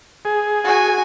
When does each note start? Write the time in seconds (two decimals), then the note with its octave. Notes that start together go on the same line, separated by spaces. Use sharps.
0.25 G#4
0.64 F#4 G#5